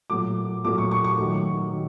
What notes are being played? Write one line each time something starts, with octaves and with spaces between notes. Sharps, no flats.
A#2 F#3 A3 D6
A#2 F#3 A3 D6
C#6
C#6
C#6
D#3 F#3 A3
D#3